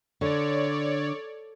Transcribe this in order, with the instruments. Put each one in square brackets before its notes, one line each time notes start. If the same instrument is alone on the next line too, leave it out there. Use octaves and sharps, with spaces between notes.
[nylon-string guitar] D3 [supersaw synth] C#5 D5